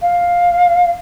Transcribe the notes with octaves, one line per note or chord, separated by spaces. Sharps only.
F5